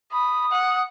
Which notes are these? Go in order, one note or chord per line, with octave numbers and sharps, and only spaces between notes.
B5 D#6
F#5